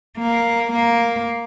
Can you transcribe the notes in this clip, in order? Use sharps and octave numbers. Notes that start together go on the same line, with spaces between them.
A#3
A#3